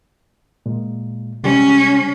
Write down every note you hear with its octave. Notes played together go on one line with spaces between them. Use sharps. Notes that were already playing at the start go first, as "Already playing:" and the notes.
A#2 G#3
C3 G3 G#3 C#4